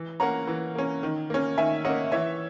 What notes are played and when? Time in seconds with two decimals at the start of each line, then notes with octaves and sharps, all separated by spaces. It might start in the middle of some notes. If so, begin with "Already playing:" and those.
Already playing: E3
0.20 A#3 C#4 F#5 A#5
0.47 E3
0.75 A#3 C#4
1.03 D#3
1.30 A#3 C#4
1.58 D#3 E5 G#5
1.85 C#4 D#5 F#5
1.90 A#3
2.12 E3 C#5 E5